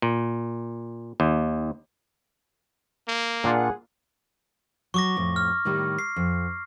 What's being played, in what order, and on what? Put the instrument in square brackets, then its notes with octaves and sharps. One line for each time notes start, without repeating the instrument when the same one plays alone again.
[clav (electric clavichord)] A#2
D#2
[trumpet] A#3
[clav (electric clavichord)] A#2 D4 F4 [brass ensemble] G#4 F#5
[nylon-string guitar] F#3 [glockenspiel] C#6 D6 A#6
[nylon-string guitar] F2 A2
[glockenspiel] F6
[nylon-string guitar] A2 D#3 G3
[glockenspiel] C7
[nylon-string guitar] F2